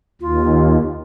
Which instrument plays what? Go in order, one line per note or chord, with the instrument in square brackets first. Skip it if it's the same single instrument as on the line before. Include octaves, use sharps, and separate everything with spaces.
[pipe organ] D#2 [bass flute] F4